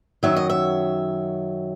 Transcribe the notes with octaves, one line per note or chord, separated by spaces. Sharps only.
F#2 D#3 F#3 E5
D#5
E5